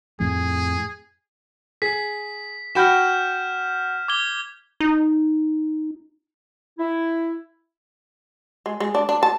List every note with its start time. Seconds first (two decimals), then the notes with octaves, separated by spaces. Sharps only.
0.20 F2 A2 G#4
1.82 G#4 B6
2.75 F#4 G5 B5 F6 G6 E7
4.08 D6 G#6 G7
4.80 D#4
6.79 E4
8.66 G#3
8.80 G#3
8.95 D4
9.09 D4
9.23 A5